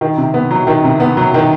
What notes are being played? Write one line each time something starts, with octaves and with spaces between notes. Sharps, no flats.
D#3
C3
B3
F#3
D#3
C3
B3
F#3
D#3